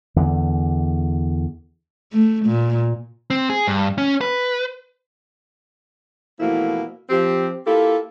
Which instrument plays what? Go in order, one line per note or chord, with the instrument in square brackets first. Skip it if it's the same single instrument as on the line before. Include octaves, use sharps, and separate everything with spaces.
[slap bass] E2 D3
[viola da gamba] A3
A#2
[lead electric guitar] C4
G#4
G2
C#4
B4
[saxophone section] B2 E3 F3 A3 A#3 E4
F3 C4 G4
A#3 E4 F4 G4 A4